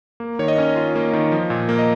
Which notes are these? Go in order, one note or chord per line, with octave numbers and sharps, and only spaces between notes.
A#3
D#3 C#5
D#5
C#4
F4
A#3
D#3
F3
A#2
A#3
D#5